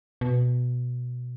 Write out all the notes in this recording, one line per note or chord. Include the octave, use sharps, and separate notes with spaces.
B2